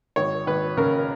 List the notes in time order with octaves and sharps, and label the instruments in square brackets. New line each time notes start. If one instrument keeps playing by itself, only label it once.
[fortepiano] G#1 C#5
G#1 B4
C#3 A#4